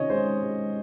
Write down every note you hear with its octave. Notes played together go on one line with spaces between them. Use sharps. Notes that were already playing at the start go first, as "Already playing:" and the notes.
Already playing: C3 D#3 C#4 C#5 D#5
G#3 C5
G#3